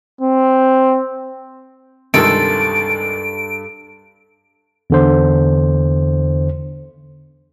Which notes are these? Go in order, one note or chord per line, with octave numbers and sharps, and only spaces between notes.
C4
C#2 G2 C3 D#3 A4 D7
E2 D3 C5